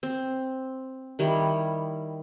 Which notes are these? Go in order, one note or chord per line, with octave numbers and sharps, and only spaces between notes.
C4
D#3 G3 E4